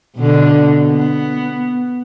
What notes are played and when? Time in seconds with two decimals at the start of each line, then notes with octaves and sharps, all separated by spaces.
0.16 B2 D3
0.90 B3